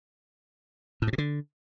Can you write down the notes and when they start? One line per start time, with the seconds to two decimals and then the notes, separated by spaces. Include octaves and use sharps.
1.02 A2
1.07 G2
1.13 B2
1.18 D3